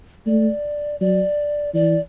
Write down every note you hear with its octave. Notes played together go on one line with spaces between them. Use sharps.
A3 D5
F#3 D5
E3 D5